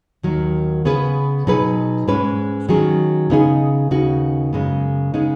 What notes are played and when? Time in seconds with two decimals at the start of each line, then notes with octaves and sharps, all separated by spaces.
0.23 D#2 D#3 F#3
0.85 C#3 B3 G#4 B4
1.47 B2 F#3 D#4 G#4 B4
2.08 G#2 G#3 C#4 B4
2.69 D#3 F#3 C#4 G#4
3.30 C#3 B3 D#4 G#4
3.91 D#2 C#3 B3 D#4 F#4
4.53 F#2 C#3 G#3 B3
5.14 C#3 G#3 B3 D#4